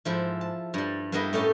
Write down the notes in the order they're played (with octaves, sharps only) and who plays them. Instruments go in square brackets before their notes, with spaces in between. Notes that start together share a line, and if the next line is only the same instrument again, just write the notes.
[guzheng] G#2 F3 E4
A5
G2 G3
G2 A#3 B3 E4 D#5 G5
A2 A3 C#4 D#4 G4 A4